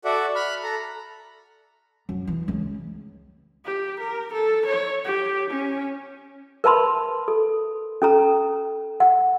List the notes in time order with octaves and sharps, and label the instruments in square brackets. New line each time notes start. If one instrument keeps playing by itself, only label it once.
[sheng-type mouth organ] F#4 A4 D5 E5 F#5
B5 F6 F#6
A4 A#5
[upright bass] F#2
E3
C#2
[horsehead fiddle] G4
A#4
A4
C#5
G4
C#4
[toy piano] A#4 B4 A5 B5 C6
A4
C#4 A4 A#5
F#5